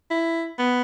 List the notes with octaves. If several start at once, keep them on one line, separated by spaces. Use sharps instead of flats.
E4
B3